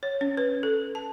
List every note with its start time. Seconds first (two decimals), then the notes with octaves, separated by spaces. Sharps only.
0.03 C#5
0.21 C#4
0.37 B4
0.63 A4
0.95 A5